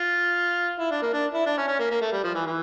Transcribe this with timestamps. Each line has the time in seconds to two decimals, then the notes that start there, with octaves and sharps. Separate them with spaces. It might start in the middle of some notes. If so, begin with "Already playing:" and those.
Already playing: F4
0.79 E4
0.91 D4
1.02 A#3
1.13 D4
1.35 E4
1.46 D4
1.58 C#4
1.68 C#4
1.79 A#3
1.91 A#3
2.01 A3
2.12 G3
2.24 F3
2.35 E3
2.46 E3